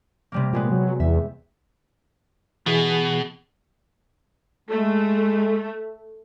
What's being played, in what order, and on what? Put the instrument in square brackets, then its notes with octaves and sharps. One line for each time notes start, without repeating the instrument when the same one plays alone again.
[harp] C3 G3 A#3
[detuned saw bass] A#2 [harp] G3 G#3 B3
[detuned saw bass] F#3
[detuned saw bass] E2 [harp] E5
[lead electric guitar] B2 [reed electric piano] E3 G#4
[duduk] G#3 [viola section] A3